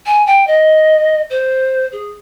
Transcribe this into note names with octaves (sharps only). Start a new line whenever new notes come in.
G#5
G5
D#5
C5
G#4